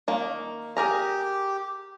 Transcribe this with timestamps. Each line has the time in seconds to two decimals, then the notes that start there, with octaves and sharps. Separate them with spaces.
0.08 D#3 A#3
0.77 G4 G#4 A#4 A#5